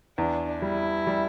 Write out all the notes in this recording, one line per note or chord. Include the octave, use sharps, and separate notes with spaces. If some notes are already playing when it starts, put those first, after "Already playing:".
E2 D4
G3 E4
G3